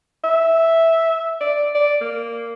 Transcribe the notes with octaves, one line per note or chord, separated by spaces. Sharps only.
E5
D5
D5
A#3